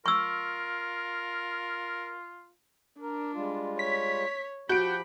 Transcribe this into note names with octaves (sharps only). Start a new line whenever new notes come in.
F4 A#4 C#6 E6
D4 A#4
G3 G#3 F4
C#5 B6
F3 F#4 G4 B5 G6 D7